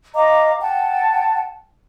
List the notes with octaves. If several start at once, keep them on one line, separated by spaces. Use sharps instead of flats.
D#5 F5 A#5 D6
F#5 G5 A5